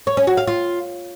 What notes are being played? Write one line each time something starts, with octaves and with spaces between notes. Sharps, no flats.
C#5
C#4
F#4
F5
F4